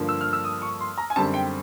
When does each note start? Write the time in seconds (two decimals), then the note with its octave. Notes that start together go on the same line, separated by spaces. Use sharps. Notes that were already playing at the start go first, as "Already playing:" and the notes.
Already playing: G2 D3 F3 A#3
0.09 E6
0.21 F6
0.33 E6
0.44 D#6
0.62 C#6
0.80 C6
0.98 A#5
1.10 G#5
1.16 F#2 D3 G3 C4 A5
1.34 G5